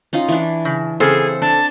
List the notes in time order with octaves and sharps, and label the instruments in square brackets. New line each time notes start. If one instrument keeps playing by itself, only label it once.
[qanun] C#4 D#4 F4
E3 D4
[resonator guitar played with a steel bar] C#3
[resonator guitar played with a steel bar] C#3 A4 C5 [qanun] C4 [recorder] G#4
[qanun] D4 [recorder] A5